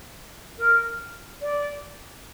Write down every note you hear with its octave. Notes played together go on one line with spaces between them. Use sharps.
A#4
D5